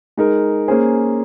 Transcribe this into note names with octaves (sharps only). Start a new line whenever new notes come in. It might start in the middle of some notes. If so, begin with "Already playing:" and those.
G#3 D#4 A#4
A#3 C#4 G#4 C5